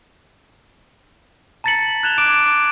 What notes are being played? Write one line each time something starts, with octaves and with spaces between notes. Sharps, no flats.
A5 A#5 A6 B6 C#7 F#7
F#6 G#6 E7 F7 G7
D6 D7 E7
D6